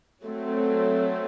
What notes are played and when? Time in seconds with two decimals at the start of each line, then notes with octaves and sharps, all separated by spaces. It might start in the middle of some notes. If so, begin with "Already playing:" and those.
0.24 F#3 A3 C4